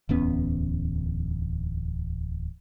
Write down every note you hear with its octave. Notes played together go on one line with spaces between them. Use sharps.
D1 E2 B3 C#4